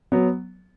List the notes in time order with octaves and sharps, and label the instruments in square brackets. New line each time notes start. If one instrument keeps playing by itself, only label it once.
[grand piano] F#3 B3